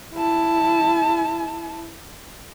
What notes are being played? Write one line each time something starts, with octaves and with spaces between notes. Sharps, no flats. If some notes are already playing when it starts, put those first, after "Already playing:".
E4 A5